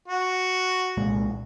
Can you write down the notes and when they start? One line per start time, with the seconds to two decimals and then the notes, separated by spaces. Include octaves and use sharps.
0.08 F#4
0.97 C2 A#2 G#3